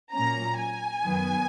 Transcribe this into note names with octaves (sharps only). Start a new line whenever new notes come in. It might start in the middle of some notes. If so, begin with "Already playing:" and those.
A#2 F#3 A#3 C#4 A#5
G#5
F#2 D#3 F#3 B3